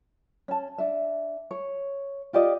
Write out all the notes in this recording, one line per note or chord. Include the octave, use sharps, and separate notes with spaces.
C#4 A5
D4 E5
C#5
F4 G4 D5 D#5